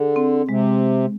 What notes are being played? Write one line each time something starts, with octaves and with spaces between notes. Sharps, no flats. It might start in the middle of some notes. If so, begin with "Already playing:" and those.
Already playing: D3 G#4
C4
C3 G#3